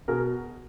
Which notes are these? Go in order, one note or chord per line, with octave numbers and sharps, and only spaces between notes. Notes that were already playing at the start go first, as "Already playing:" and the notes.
B2 G#4 A#4